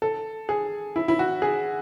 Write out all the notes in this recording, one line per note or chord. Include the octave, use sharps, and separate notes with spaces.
A4
G#4
E4
E4
F#4
G#4